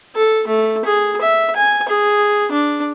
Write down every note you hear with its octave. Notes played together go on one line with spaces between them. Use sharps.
A4
A3
G#4
E5
G#5
G#4
D4